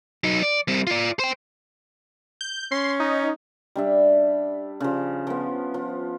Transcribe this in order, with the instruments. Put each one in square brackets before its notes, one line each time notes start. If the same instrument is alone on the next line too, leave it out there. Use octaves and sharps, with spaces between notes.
[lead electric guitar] F#3 D#4
D5
G3 C4
F4 D5
C5 G5
[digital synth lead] G6
[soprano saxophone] C#4 [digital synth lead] C6
[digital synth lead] D#4
[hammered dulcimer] G3 D4 E5
C#3 F3
F3 B3
F3